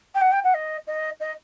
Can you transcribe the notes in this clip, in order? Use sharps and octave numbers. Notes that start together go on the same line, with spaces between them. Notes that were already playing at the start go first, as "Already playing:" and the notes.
G5
F#5
G5
F#5
D#5
D#5
D#5